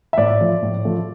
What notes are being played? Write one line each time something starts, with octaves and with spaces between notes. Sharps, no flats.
E5
A2 D5
F3 A3
A2
F3 A3